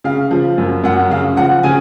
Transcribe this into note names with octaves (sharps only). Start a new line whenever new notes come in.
C#3 F5
F3
F#2
F#2 F#5
C#3 F5
F3 F#5
C#3 G#5